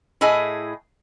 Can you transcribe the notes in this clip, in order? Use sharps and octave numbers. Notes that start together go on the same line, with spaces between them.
A2 E4 G#4 D#5 G#5